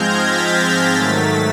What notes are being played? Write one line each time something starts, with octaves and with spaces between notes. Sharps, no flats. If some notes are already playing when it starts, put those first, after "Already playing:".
Already playing: G#2 F3 G#3 C4 F6 G6 G#6 A#6
A6 B6
G#2 D#3 F#3 A3